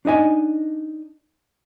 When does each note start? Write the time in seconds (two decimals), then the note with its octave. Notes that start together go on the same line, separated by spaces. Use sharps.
0.05 D4 D#4 D#5 G#5